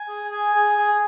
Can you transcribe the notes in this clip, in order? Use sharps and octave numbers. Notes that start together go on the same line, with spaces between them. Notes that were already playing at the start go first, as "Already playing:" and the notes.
Already playing: G#5
G#4
G#5
G#4
G#4